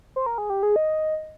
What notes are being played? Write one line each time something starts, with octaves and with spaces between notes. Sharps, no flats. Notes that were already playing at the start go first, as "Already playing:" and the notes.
C5
A#4
G#4
G4
G#4
D#5